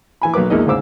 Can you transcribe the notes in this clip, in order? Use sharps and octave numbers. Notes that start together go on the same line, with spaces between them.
E3 G#5 B5
B1 F#3 A#3 B4 D6
A#1 E2 G#3 A#3 D#4 D#5
D2 G#2 C#3 C5 D6 E6